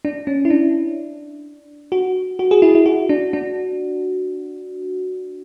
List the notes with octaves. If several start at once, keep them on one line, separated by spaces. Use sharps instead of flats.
D4
C#4
E4
D4
F#4
F#4
G#4
E4
E4
F#4
D4
D4